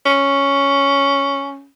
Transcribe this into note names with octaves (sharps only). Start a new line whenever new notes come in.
C#4